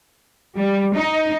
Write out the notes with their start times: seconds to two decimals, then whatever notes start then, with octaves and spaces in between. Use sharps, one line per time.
0.57 G3
0.94 D#4